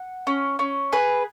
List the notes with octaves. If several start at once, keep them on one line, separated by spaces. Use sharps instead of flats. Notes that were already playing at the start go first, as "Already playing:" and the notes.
Already playing: F#5
C#4
C#4
G#4 B4